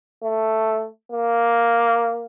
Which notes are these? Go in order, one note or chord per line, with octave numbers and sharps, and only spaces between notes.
A3
A#3